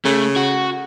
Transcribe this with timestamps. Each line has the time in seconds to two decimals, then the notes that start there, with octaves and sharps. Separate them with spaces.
0.05 C#3 A3
0.36 F#4